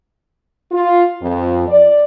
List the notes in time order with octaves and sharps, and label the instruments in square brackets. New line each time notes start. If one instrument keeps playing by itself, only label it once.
[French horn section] F4
F2
D5